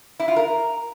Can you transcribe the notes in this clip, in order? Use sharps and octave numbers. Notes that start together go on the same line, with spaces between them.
E4
F4
A#4